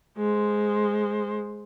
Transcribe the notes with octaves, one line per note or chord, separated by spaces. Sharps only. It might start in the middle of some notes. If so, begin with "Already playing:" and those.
G#3 C5